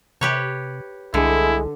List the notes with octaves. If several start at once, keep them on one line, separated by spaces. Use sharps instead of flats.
C3 G4 B4 C#5
C2 D3 G#3 E4